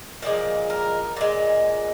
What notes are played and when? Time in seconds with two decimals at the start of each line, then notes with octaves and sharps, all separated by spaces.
0.22 A#2 F3 G#3 D5
0.70 A#4
1.16 A#2 G#3